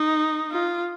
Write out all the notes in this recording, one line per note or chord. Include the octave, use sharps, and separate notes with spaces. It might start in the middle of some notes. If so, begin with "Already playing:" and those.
Already playing: D#4
F4